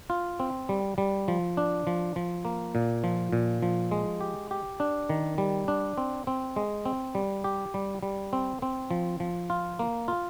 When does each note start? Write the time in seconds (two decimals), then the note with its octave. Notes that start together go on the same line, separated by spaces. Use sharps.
0.10 F4
0.40 C4
0.69 G3
0.98 G3
1.28 F3
1.57 D4
1.87 F3
2.16 F3
2.45 A#3
2.75 A#2
3.04 F3
3.33 A#2
3.63 F3
3.91 G#3
4.21 G4
4.51 G4
4.80 D4
5.09 D#3
5.38 G3
5.68 D4
5.98 C4
6.27 C4
6.56 G#3
6.85 C4
7.15 G3
7.44 G4
7.74 G3
8.03 G3
8.33 C4
8.62 C4
8.91 F3
9.20 F3
9.50 F4
9.79 A#3
10.08 F4